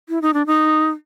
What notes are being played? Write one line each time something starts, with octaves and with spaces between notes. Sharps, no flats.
E4
D#4
D4
D#4